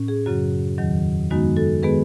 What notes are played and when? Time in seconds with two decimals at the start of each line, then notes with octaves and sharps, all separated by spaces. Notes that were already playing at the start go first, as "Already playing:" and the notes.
Already playing: A2 C#4
0.08 G#4
0.26 F#2 C#3 F#3 F#4
0.78 E2 D#3 F#3
1.30 F#2 D#3 G#3 B3 D#4 F#4
1.56 F#4 A4
1.83 D#3 G#3 B3 G#4 B4